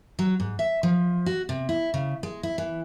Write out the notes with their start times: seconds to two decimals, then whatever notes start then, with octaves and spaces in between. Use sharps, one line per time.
0.19 F#3
0.40 G#2
0.59 E5
0.83 F3
1.26 F#4
1.49 C3
1.69 E4
1.94 C#3
2.23 G#3
2.43 E4
2.58 E3